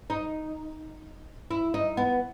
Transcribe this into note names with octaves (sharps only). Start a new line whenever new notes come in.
D#4
E4
D#4
B3